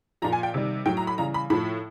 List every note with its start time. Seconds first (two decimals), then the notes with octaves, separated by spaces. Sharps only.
0.22 A#2 F3 A#5
0.33 G#5
0.43 G5
0.54 C3 D#3 G3
0.86 A2 F#3 G5
0.97 A#5
1.07 B5
1.18 C#3 E3 G3 A#5
1.34 B5
1.50 A2 F3 B5